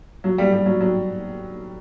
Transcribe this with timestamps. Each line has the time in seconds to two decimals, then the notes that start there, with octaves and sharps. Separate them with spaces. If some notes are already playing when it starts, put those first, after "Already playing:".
0.24 F#3
0.38 G3
0.52 G3
0.66 F#3
0.81 F#3